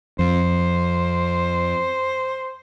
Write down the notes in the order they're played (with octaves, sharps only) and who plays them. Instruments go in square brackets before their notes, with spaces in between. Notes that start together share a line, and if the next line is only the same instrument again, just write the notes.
[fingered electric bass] F2 [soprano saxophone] C5